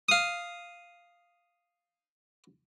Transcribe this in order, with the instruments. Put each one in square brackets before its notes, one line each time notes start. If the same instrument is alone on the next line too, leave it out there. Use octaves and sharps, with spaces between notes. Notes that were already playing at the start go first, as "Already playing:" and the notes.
[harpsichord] F5 D#6